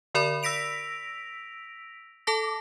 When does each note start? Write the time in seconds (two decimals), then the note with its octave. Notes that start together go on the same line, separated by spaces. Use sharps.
0.14 D3 A#4 D5 B5
0.43 E6 A#6 B6 D7 F7
2.27 A4 A5 D6 A#6